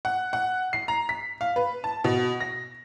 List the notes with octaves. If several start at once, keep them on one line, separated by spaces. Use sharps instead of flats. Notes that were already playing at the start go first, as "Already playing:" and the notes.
F#5
F#5
C7
A#5
B6
F5
B4
A5
B2
A#6